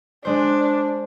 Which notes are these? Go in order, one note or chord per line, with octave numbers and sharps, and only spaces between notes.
G#3 D4 C5